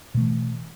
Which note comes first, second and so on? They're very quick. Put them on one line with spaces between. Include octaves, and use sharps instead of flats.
B2 A3 E3